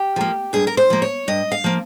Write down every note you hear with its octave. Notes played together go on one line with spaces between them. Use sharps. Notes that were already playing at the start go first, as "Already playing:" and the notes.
Already playing: G4
F3 A#3
G2 G#4
A#4
C5
F3 A#3
C#5
G2 D#5
F5
F3 A#3